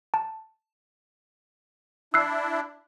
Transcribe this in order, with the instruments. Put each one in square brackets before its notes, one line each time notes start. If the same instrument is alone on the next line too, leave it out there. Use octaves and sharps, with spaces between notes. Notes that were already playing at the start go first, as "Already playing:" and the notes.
[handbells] A5
[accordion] D4 E4 [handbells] E6 F#6 C7